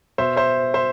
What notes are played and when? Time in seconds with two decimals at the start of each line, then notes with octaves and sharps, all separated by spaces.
0.18 B2 C5 E5
0.36 C5 E5
0.74 C5 E5